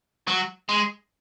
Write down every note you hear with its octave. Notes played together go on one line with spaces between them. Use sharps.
F#3
G#3